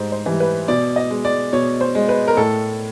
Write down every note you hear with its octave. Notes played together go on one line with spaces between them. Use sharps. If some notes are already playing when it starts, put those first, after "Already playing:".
Already playing: G#2 G3 C5
C5
E3 G3
B4
B2 D5
D#5
G#3
D5
B2 C#5
C5
G#3
B4
A#4
A2 A4